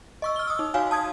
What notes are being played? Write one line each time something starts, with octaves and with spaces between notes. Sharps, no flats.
D#5 C#6 E6
F6 G7
D#6 E6
D#4
F#4 C#5 F5 G#5
A5 D#6 G#6